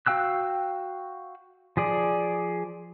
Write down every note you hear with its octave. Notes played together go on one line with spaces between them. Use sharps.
F#4 F5 G5 E6 F#6
F3 G#4 D5